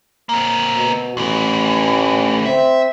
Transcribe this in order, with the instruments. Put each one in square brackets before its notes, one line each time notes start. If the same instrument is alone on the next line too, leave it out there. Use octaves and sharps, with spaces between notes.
[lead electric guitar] A#3 C4
[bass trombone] B2
[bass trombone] A1 [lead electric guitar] D2 E3
[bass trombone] C4 [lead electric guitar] E5